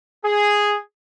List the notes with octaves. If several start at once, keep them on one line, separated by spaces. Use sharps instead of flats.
G#4